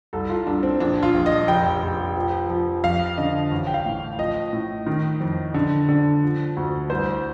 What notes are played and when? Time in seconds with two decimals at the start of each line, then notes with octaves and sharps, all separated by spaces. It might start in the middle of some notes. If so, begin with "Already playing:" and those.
0.13 C2 A4
0.29 F4
0.47 C2 D4
0.63 C4
0.80 A#1 D4
1.03 F4
1.14 A#1
1.26 D#5
1.48 F1 G5
1.83 F1
2.16 F3
2.50 F3
2.84 F2 F5
3.17 D3 D#5
3.51 A1
3.67 G5
3.74 F5
3.86 A2
4.19 F3 D#5
4.53 A2
4.86 D#3
5.20 F2
5.54 D3
5.88 D3
6.23 F3
6.57 D2
6.90 C2 C5